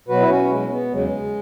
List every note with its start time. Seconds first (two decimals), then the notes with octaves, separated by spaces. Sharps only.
0.08 B2 F#3 F#4 B4
0.20 E4
0.29 C#4 F#4
0.50 B2 F#3 G#3
0.71 B3
0.91 E2 C#3 F#3 G#3